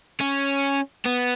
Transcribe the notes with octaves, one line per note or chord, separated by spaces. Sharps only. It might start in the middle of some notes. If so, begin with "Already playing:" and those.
C#4
B3